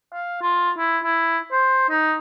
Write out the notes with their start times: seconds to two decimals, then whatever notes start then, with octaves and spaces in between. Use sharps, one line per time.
0.13 F5
0.42 F4
0.78 E4
1.04 E4
1.52 C5
1.89 D#4